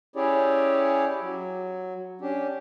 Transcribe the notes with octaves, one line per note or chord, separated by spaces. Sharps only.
C#4 E4 G4 G#4 C#5 D5
F#3
C#4 D4 G4